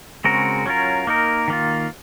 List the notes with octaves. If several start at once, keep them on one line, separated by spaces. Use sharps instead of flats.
C#3 G#3 C4 F#4 A#4
F#3 C#4 F4 A#4
A#3 D#4 A#4
D#3 A#3 F4